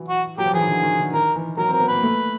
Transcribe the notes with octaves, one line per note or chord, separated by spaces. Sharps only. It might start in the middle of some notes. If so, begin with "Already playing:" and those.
Already playing: E3 F#3
F#4
F#3 G4
F3
E3 G#4
D#3
D3
D#3
D3
D#3 A#4
E3
F#3 A#4
C4
A#4
B3
A#3 B4
A3